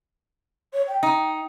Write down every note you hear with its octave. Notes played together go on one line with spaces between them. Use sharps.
C#5
G5
D#4